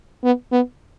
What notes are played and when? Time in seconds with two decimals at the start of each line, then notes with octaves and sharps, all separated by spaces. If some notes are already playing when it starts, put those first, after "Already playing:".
0.23 B3
0.52 B3